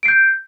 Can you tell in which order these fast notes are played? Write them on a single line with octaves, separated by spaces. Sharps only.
D7 C7 G6